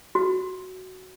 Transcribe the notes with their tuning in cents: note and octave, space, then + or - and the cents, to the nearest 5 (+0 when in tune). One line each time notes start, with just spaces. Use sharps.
F#4 +5